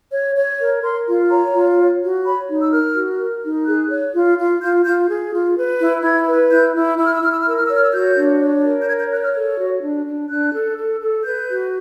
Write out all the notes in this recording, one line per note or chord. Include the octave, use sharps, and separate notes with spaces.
C#5
C#5
A#4
A#4 C6
F4
C#5 A#5
F4
C#5
F#4
C#5 B5
D#4
E6
A#4 F6
F#4
A#4
D#4
G#4 F#6
C#5
F4
F4
F4 G6
F4 G6
G#4
F4
B4
E4
E4 G#6
B4
E4 G6
E4
E4 E6
F6
E6
E4 F6
E6
F6
A#4 E6
F6
C#5 E6
F6
E6
F#4 G6
D4
C#5
A#4
G6
C#5 G#6
G6
C#5 F#6
F6
A4
F#4
D4
D4
D4 F#6
A4
A4
A4
B4 G6
F#4